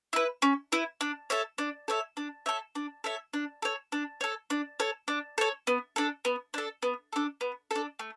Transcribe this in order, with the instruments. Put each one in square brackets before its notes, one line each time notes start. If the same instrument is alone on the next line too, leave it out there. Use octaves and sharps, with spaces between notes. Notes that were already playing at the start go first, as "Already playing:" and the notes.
[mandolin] E4 B4
C#4
E4 B4
D4
A4 C#5 E5
D4
A4 C#5 E5
D4
A4 C#5 E5
D4
A4 C#5 E5
D4
A4 C#5
D4
A4 C#5
D4
A4 C#5
D4
A4 C#5
B3
D4 A4
B3
D4 A4
B3
D4 A4
B3
D4 A4
A3